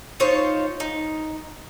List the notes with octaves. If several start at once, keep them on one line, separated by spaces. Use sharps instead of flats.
D#4 F4 C5 C#5
D#4